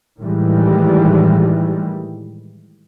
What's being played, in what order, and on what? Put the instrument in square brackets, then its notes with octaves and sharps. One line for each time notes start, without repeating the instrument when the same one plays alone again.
[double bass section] A2 D#3 E3 G3 G#3